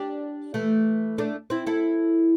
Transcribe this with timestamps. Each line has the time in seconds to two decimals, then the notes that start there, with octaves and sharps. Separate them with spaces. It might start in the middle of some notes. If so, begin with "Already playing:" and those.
Already playing: D4 G4
0.54 E3 A3
1.18 A3 D4
1.50 C4 E4
1.67 E4 A4